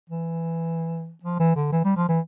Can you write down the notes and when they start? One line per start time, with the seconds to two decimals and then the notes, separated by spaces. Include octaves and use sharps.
0.10 E3
1.23 F3
1.39 E3
1.56 D3
1.72 E3
1.84 G3
1.97 F3
2.09 E3